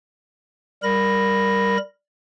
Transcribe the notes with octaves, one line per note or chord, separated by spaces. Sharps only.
G3 A#4 B5 A#6